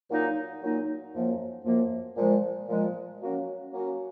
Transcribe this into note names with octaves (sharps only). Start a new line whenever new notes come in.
A#2 F#3 A#3 D#4
A#2 F#3 A#3 D#4
F#2 F3 A#3
F#2 F3 A#3
A#2 F3 G#3
A#2 F3 G#3
F#3 A#3 C#4 F#4
F#3 A#3 C#4 F#4